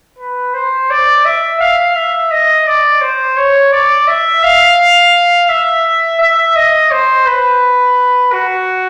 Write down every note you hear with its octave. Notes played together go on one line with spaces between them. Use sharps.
B4
C5
D5
E5
F5
E5
D#5
D5
C5
C#5
D5
E5
F5
E5
E5
D#5
C5
B4
F#4